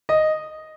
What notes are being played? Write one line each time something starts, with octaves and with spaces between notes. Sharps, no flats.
D#5